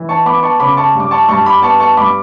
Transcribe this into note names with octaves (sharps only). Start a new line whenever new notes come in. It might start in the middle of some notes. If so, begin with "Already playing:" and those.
Already playing: E3
A5 C#6
B3 B5 D6
A5 C#6
C#3 B5 D6
A5 C#6
G2
D6
A5 C#6
G2 A5 C#6
B5 D6
B3 A5 C#6
A5 C#6
G2 B5 D6